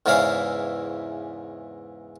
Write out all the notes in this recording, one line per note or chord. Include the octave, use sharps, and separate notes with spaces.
E2 G#2 C#3 E3 E4 F5